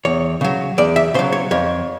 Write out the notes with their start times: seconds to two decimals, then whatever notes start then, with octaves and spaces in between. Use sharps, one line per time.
0.05 E2 C#5
0.41 C#3 F#3
0.78 E2 D5
0.96 E5
1.14 C#3 C5
1.19 F#3
1.32 C#5
1.51 F2 C#5